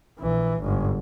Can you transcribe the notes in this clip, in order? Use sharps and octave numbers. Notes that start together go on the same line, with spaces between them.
A#1 E3
G1 G#2